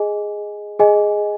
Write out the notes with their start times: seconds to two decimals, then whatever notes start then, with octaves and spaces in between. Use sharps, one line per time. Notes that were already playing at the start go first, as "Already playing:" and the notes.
Already playing: G#4 D#5 G#5
0.80 G#4 D#5 G#5